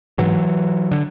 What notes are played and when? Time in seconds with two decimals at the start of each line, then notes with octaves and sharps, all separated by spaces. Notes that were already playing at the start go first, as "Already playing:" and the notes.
0.18 G#2 E3 F#3
0.91 D3